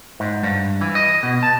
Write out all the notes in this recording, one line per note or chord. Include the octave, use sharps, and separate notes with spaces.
G#2
G2
E3
D#5
B2
A5